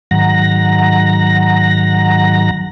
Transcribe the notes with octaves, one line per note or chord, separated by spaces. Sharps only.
G#2 D#3 F#3 F#5 A#5 A#6